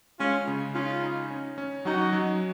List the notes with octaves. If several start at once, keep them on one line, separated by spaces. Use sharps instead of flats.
G#3 C#4 F4
C#3
C#4 D#4 F4
D#4
C#4
C#4
F#3 D#4 F#4
F#3